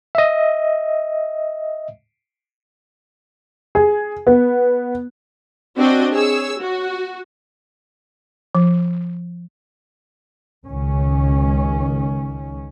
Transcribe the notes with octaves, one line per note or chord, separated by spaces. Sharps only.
D#5 E5
G#4
B3
C4 D4 F#4 D#5
G#4 C#5 E6
F#4
F3
C#2 D#3 C#4